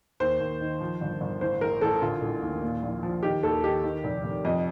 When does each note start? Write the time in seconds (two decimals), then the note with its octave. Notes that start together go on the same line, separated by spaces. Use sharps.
0.20 D#2 C5
0.40 D#2
0.61 D#3
0.81 F3
1.01 G1
1.21 G1
1.41 A1 C5
1.61 A1 A#4
1.81 A1 A4
2.02 D3 F4
2.22 D3
2.42 D#2
2.63 A#2
2.83 A#1
3.03 F3
3.23 D#3 G4
3.43 D#2 A4
3.64 D#3 G4
3.84 D#3
4.04 F1
4.24 F1
4.45 F2 D#5